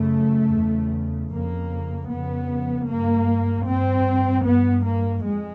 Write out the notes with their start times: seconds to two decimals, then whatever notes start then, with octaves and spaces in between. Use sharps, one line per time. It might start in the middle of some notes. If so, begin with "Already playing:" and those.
Already playing: F#2 C#3 A3
0.54 E2 C#3
1.32 F2 C#3 A#3
2.11 F2 C#3 B3
2.89 G2 A#3
3.67 G2 C4
4.45 G2 B3
4.85 A#3
5.24 F2 G#3